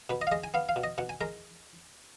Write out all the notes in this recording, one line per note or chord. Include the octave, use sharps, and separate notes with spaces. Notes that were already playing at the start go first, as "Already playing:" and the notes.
B2 B4
D#5
F5
G#3 D#5
G#5
B3 F5
F5
B2
D#5
B2 F#5
G#5
G#3 A#4